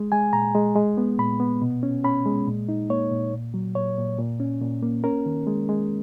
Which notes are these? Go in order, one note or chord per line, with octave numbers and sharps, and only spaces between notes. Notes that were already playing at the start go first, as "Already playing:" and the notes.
Already playing: G#3
G#3 G#5
A#2 A#5
G#3
G#3
B3
A#2 B5
B3
B2
C#4
C#4 B5
G#3
A#2
D#4
A#3 C#5
A#2
A#2
F#3
A#2 C#5
A#2
A#2
C#4
A#2
A#3
C#4 A#4
D#3
G#3
G#3